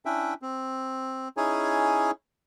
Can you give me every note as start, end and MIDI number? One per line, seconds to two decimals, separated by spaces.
0.06 0.34 61
0.06 0.34 62
0.06 0.34 64
0.06 0.34 76
0.06 0.34 79
0.42 1.28 60
1.37 2.11 61
1.37 2.11 63
1.37 2.11 64
1.37 2.11 68
1.37 2.11 73
1.37 2.11 80